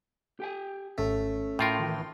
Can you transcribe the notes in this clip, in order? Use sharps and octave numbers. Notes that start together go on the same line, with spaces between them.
G4 G5 G#5
G#1 A3 C#4
A2 F4 A#4 G5 C6
D#3 E3